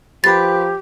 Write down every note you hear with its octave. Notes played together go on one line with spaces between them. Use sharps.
F3 G4 A#4 B4 C6 A6